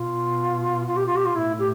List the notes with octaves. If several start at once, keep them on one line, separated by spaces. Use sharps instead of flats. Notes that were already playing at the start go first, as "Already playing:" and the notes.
Already playing: B2 F4
F4
G4
F4
G4
F4
A2 E4
G4